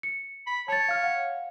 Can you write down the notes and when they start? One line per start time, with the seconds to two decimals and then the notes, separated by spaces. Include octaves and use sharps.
0.03 C#7
0.47 B5
0.68 C#5 A5 A6
0.88 F5 F6
1.03 F5 F#5